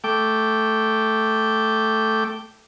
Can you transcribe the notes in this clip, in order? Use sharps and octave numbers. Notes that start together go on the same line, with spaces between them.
A3 G5 D6